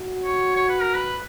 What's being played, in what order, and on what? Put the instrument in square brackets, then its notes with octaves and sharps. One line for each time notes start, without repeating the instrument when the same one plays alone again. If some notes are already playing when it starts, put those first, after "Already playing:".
Already playing: [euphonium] F#4
[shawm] C#5
C#5
B4
A#4
B4